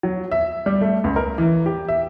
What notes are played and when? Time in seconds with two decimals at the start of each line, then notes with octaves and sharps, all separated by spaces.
0.03 F#3
0.32 E5
0.66 G3
0.81 A3
1.04 C#2
1.16 A#4
1.38 E3
1.66 G4
1.89 E5